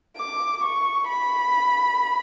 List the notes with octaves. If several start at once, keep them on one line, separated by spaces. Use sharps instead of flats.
D6
C#6
B5